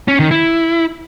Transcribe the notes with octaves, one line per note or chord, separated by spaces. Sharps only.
C#4
D#3
E4